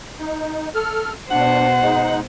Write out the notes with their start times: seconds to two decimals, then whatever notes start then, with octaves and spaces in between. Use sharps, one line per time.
0.19 D#4
0.75 A4 F6
1.31 B2 D4 C5 F#5
1.82 G#3 D#4